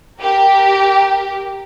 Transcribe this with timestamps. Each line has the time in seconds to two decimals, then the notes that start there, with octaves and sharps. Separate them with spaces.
0.19 G4 A#4